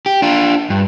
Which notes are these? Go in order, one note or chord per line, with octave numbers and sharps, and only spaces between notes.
G4
D4 F4
G2